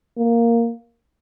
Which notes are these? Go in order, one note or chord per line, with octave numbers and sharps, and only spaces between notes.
A#3